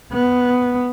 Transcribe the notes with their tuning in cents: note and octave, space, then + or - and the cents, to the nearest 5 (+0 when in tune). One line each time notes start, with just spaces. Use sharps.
B3 +5